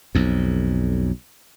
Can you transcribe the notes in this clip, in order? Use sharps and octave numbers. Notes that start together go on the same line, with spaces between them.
B1 F2